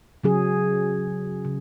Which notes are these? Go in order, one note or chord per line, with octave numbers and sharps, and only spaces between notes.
C#3 F#3 C#4 G#4
C#3